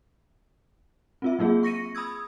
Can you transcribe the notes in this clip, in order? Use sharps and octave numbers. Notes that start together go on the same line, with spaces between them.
C4 F4 E5
F#3 A#3 F4 G#4
C#6 A#6 C#7 D#7
B5 D#6 E6 G#6